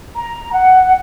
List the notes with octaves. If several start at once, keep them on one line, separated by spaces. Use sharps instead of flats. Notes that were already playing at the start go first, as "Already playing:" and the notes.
A#5
F#5